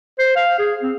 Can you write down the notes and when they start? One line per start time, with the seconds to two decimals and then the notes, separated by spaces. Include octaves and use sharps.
0.19 C5
0.36 F5
0.59 G#4
0.83 C4